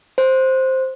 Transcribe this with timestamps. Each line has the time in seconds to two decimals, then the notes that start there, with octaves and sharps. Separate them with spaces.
0.18 C5